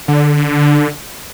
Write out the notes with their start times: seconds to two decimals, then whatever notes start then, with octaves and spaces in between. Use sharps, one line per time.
0.08 D3